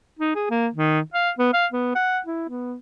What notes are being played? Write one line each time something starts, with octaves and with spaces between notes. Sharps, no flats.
D#4
G#4
A#3
D#3
F5
B3
F5
B3
F#5
E4
B3